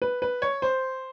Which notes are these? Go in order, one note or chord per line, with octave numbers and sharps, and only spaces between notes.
B4
B4
C#5
C5